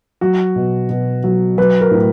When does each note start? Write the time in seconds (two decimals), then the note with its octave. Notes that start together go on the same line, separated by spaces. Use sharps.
0.21 F#3 F#4
0.56 B2
0.90 B2
1.24 F#3
1.58 F#3 B4
1.81 A#4
1.91 A2